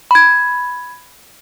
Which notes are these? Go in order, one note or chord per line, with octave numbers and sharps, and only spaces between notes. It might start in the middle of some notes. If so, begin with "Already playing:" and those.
B5 G#6